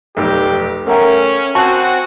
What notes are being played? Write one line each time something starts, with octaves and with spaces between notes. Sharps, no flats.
F1 B1 G4
A3 C#4 A#4 E5 F#5 G5 A#5
C4 F#4 G#5 A5 C#6 F#6